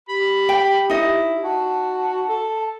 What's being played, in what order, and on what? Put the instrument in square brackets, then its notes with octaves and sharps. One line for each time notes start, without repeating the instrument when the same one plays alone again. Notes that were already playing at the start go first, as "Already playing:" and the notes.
[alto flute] G4 [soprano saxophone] B5
[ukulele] G5
[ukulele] D#4 D#5 [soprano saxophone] E4
[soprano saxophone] F#4 [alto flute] A5
[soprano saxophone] A4